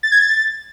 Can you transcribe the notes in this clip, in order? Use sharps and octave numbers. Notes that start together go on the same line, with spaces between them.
A6
G#6
A6